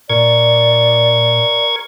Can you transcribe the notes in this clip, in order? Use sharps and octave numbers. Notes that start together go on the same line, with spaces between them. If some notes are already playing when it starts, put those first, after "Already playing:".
A#2 A#4 D5 C#6 G#6